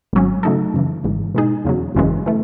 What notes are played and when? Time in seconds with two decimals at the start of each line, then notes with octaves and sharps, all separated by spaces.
0.13 G#1 G#2 F#3 C#4
0.43 C#3 F#3 A3 D#4 A4
0.74 F#2 C#3 E3
1.04 G#1 G#2 E3
1.34 B2 G#3 D#4 G#4
1.65 E2 C#3 F#3
1.95 G#1 F#2 C#3 E3 G#3
2.26 E3 A3